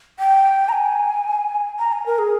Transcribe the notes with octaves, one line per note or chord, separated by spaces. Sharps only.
G5
A#5
G#5
A#5
G#5
A#4
G#4